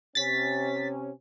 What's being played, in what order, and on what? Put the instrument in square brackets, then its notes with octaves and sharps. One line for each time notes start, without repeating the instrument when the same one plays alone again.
[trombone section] C3 C#4 [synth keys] A6 B6